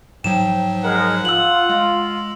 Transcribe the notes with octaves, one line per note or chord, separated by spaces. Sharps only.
G#2 F3 F#3 G5 E7
G#3 A#4 F#5
F4 E6 F#7
G#3